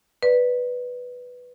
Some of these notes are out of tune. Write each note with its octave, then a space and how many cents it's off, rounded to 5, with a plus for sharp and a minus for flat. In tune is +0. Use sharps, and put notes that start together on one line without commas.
B4 +0 D5 +10